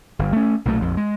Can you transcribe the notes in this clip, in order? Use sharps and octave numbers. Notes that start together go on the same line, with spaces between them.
G1
A3 C#4
B1 A#2 F3 A3
A#1 F2
G#3